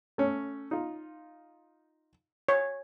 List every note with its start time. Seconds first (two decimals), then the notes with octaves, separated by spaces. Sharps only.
0.18 A3 C#4
0.71 D#4 F4
2.49 C#5